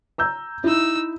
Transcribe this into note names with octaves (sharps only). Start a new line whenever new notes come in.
A#5 E6 G6
D#4 E4 E6